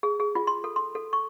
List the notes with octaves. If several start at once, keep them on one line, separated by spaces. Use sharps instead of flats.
G#4
G#4
F4
C6
A4
C6
A4
C#6